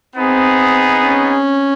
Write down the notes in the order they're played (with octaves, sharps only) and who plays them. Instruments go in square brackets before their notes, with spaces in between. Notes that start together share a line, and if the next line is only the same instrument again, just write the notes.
[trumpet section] B3 D#4 G#4 [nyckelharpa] C4
[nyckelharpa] C#4